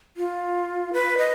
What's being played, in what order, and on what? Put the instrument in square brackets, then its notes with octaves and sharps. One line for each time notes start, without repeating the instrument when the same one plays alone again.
[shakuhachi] F4
B4
D#5